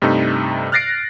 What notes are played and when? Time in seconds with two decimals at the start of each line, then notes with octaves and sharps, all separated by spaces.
0.02 G2 C3 A3 D#4
0.72 F6 F#6 A6 A#6 C7 D7